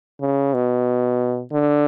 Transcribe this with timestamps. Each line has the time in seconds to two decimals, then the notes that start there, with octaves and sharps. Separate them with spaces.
0.21 C#3
0.54 B2
1.52 D3